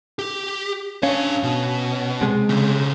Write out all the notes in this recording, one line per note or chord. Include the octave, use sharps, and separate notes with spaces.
G4
C#4 D4 F5
B2
C3 G#3
C#3 C4